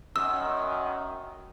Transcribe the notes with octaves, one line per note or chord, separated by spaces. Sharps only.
F#2 D#3 E6